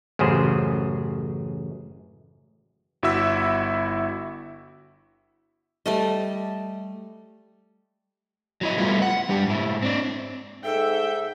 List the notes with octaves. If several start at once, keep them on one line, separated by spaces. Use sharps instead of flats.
A1 F#2 C#3 G#4 C5
G1 E4 F#4 E5 E6 B6
G3 A3 D#5
F#3 E4 D#5
G3 A3 B3 E4 F4
F#5
G3 D4 G4
G#2 E4
C4 D4
G#2 A4 E5 G5